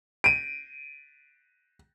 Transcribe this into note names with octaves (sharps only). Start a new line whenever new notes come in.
D7 D#7